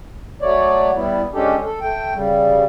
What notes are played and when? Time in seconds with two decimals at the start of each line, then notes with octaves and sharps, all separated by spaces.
0.42 F#3 A3 C#5 D5
0.96 G3 B3 E4
1.34 G#3 C#4 D4 G4 A4
1.65 A4
1.81 A3 G5
2.14 C#3 G3